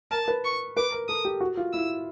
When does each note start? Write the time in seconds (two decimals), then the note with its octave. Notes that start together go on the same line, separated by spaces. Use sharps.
0.11 A#4 A5
0.28 B4
0.44 C#6
0.77 B4 D6
0.92 A#4
1.08 A4 D#6
1.25 G4
1.41 F#4
1.57 F4
1.73 E4 E6